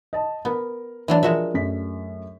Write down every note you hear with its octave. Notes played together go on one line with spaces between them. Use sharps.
D#5 A5
B3 A#4
E3 F#3 D4
F3 G#3 F#4 A#4 E5
F#2 A3 B6